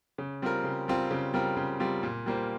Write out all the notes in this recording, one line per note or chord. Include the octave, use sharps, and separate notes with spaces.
C#3
G3 C4 F4 A#4
C#3
G3 C4 F4 A#4
C#3
G3 C4 F4 A#4
C#3
G3 C4 F4 A#4
A#2
G3 A#3 F4 C5